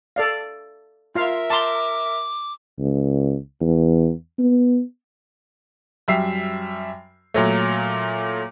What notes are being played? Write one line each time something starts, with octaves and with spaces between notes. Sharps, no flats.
A4 D5 F5
F4 A#4 E5 F5
A5 A#5 C6 D6
C#2
E2
B3
F#2 G3 E5 C7
A#2 F#3 A3